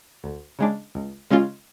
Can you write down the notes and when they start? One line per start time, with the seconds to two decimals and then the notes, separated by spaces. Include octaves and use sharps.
0.24 D2
0.59 C#3 G#3 D4
0.95 C#2
1.30 C#3 G#3 C#4 F4